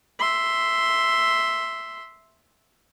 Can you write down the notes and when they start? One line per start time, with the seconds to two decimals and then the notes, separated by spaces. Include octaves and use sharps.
0.20 E5 C6